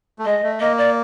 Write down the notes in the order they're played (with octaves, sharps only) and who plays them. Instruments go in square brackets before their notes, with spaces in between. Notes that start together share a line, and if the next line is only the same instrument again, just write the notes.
[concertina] A3
[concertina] G#3 [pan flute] D#5
[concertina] A3
[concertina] A#3 [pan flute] D#5
[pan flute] D5